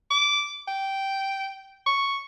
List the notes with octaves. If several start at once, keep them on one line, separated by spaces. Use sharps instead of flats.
D6
G5
C#6